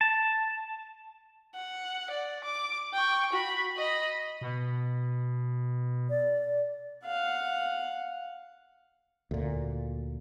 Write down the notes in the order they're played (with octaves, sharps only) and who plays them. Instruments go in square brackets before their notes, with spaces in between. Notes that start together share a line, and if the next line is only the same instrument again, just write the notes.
[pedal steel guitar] A5
[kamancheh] F#5
D5
D6
G5 C#6
F#4 B5
D#5 B5
[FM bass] B2
[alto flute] D5
[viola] F5 F#5
[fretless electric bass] D2 A#2